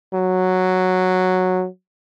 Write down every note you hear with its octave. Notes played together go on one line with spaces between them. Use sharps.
F#3